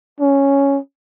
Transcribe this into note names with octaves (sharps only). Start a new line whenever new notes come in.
C#4